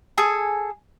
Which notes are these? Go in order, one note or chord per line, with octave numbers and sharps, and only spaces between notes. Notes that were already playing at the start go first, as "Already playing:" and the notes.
G#4 A4 G#5